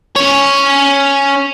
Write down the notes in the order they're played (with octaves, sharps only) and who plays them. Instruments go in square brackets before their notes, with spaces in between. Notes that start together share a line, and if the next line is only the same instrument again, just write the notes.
[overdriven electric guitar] C#4 C#5